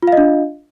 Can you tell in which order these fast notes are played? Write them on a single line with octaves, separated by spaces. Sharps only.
F4 F5 D#5 D4